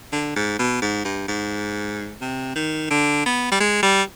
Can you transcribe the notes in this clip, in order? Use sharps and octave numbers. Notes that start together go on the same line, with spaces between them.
D3
G#2
B2
G#2
G2
G#2
C3
D#3
D3
B3
G3
G#3
G3